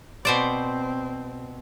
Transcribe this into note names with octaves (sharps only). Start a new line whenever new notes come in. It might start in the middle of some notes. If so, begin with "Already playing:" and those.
B2 C4 C5 D5